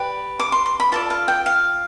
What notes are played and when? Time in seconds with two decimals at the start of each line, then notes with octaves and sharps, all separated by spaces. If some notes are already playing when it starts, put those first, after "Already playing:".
Already playing: G4 B4 D5
0.40 D6
0.52 C6
0.66 C6
0.80 B5
0.92 F4 A4 D5 A5
1.10 F5
1.28 G5
1.46 F5